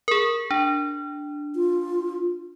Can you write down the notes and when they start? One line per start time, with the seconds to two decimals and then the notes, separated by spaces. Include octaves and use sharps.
0.08 G#4 A#4
0.51 D4
1.56 F4